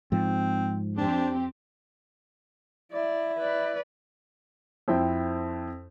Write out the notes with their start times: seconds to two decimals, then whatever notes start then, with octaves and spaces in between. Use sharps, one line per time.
0.12 G#2 F3 C4
0.97 F2 C4 D4 G4
2.92 E4 D5
3.38 B4 D5
4.88 F2 C4 E4 G5